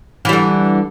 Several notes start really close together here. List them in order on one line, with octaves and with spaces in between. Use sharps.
E3 G3 D3